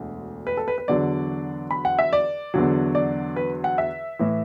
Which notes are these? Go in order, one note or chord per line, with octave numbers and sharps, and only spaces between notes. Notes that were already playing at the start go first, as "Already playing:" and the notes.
Already playing: E1 D2 D3
B4
A4
B4
B4
E2 D3 F#3 D5
B5
F#5
E5
D5
E2 D3 F#3
D5
B4
F#5
E5
A2 E3